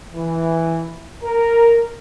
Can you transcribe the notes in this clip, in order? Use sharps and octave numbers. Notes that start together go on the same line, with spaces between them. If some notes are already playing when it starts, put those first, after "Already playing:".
E3
A#4